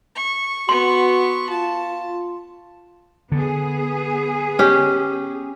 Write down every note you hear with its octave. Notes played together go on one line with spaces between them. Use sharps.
C#6
B3 F#4 C6 C#6
F4 A5
D3 B3 G#4
C#4 G4